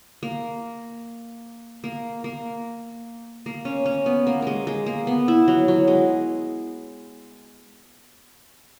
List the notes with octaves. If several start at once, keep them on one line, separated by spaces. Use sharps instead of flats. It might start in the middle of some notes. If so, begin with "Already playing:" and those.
A#3
A#3
A#3
A#3
C#4
C#4
B3
A#3
G#3 A#3
G#3
A#3
B3
E4
F#3
F#3
G#3